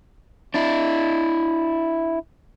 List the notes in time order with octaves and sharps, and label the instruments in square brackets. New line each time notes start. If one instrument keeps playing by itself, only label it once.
[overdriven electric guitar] D4 E4